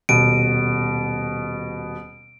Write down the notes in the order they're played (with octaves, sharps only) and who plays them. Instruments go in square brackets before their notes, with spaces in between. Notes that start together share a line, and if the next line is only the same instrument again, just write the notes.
[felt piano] D#1 B2 D#7 [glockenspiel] D7